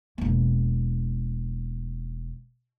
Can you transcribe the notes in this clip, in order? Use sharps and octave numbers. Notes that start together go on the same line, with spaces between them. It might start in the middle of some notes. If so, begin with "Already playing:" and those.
E1 A#3